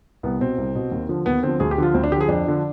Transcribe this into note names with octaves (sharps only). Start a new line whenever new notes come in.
C2 B3
B2 C4
C2
B2
D#2
D3 F3
D#2 B3
D3 F3 C4
D2 G#4
G4
D3 F3 F4
D2 C4
D4
D3 F3 G4 G#4
F2 D4
D3 F3